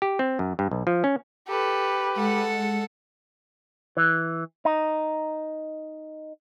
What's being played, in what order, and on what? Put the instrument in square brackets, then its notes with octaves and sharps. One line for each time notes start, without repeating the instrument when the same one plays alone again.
[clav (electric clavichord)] G4
C4
F#2
G2
B1
F3
C#4
[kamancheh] G4 B4 [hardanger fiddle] A4
[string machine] G#3 [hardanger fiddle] A4 F#5
[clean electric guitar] E3
D#4